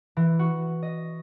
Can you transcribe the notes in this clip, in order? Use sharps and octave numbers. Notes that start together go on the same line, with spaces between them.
E3
F#4
D#5